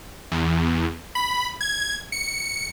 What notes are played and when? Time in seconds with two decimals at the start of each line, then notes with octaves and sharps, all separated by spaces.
0.32 E2
1.15 B5
1.61 G#6
2.12 C#7